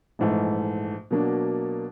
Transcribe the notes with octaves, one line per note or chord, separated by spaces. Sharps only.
A#1 G#2 E3 A3
B2 F#3 A#3 D4